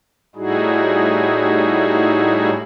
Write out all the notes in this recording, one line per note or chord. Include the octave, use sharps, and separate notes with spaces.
A2 G3 D#4 E4 F#4 G#4